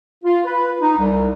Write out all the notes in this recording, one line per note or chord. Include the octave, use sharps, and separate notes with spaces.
F4
B4
D#4
C2